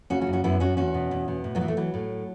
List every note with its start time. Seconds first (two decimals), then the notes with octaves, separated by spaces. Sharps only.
0.10 C#3 C#4 F#4
0.21 C#4 F#4
0.27 F#2
0.33 C#4 F#4
0.44 F#2 B3 E4
0.60 F#2 C#4 F#4
0.77 E2 C#4 F#4
0.94 B2
1.11 E2
1.28 B2
1.44 A2
1.55 F#3 B3
1.61 E3
1.68 A3
1.77 E3 F#3
1.94 A2